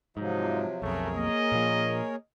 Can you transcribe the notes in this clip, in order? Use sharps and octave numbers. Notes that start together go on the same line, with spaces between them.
G#2 C3 F3 F#3 D#4
B1 F2 A3 G#4 A#4 C#5
A#3 D#5
A#2 F3